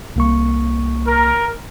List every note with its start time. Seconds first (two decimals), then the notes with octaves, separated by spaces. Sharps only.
0.16 C2 A#3 C#6
1.06 A#4